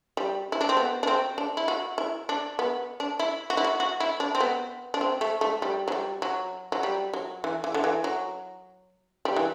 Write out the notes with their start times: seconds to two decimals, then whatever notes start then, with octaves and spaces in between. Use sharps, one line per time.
0.17 G3
0.52 E4
0.61 D4
0.69 C4
0.77 B3
1.03 D4
1.07 C4
1.38 D4
1.57 E4
1.68 F#4
1.98 E4
2.29 D4
2.59 B3
3.00 D4
3.19 E4
3.50 F#4
3.57 E4
3.64 F#4
3.80 F#4
4.00 E4
4.20 D4
4.35 C4
4.40 B3
4.94 D4
5.01 C4
5.21 A3
5.41 A3
5.62 G3
5.88 F#3
5.92 G3
6.22 F#3
6.72 F#3
6.83 G3
7.14 F#3
7.44 E3
7.64 E3
7.74 D3
7.84 E3
8.04 F#3
9.25 G3
9.36 E3